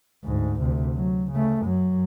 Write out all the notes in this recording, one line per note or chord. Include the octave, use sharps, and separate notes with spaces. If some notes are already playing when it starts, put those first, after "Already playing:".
D2 G#2
D2 C3
F#3
C#3 A3
F#2 F#3